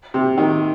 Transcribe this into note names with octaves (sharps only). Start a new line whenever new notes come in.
C3
D#3